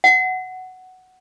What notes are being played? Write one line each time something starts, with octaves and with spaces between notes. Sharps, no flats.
F#5